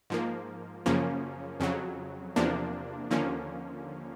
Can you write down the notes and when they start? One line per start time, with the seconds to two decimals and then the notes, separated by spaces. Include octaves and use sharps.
0.10 G#2 F3 A#3
0.86 F#2 C#3 F3 A#3 C#4
1.60 F2 C#3 F#3
2.36 E2 C3 F3 A#3 D4
3.11 D#2 D3 F3 A#3 C#4